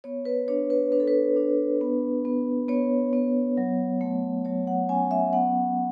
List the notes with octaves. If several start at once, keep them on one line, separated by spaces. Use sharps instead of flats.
B3 C#5
B4
D4 C#5
B4
D4 B4
A4
B4
D4
B3
B3
B3 C#5
B3
F#3
A3
F#3 C#5
F#5
C#4 G#5
E5
B3 F#5